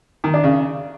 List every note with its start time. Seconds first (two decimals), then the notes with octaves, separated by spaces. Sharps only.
0.24 D#3
0.34 D4
0.44 C#3